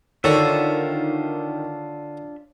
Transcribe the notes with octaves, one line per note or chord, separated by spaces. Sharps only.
D3 D#3 D4 F4 F#4 C#5 E5